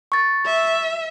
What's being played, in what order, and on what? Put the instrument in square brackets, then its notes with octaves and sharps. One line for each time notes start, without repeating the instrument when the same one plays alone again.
[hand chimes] C#6 A6
[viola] E5